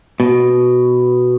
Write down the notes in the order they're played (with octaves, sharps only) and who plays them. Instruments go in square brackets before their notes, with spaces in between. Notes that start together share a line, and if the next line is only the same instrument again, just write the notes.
[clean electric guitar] B2